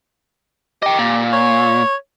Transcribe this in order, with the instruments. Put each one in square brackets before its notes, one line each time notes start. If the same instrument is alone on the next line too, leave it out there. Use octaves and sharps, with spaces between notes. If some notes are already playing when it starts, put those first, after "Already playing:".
[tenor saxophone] G4 [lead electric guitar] D#5 G5
[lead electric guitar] A#2
[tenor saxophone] C#5